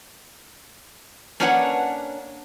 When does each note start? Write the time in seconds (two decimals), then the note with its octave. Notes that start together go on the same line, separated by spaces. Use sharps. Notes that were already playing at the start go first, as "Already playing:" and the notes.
1.40 A#3 C#4 D4 B4 C#5 F#5